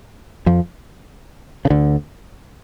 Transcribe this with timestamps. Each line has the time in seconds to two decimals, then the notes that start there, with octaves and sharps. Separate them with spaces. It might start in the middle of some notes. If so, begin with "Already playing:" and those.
0.46 F2 F3
1.65 C#3
1.70 D2 D3